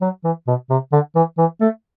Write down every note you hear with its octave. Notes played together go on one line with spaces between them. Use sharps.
F#3
E3
B2
C3
D3
E3
E3
A3